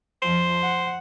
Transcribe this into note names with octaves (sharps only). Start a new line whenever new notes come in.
F2 F3 C5
F#5